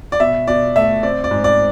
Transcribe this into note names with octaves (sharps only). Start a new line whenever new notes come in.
D5
B2 E5
B2 D5
A3 E5
C4 D5
D5
G#2
D5